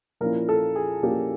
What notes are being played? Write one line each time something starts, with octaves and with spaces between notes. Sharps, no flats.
A#2 F3 A#3 C#4 E4 A#4
A4
G#4
A#2 F3 A#3 C#4 E4 G4